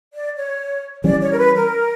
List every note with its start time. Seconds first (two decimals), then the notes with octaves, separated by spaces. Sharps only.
0.14 D5
0.36 C#5
1.04 E3 G3 C#4 D5
1.21 C#5
1.32 A#4
1.38 B4
1.55 A#4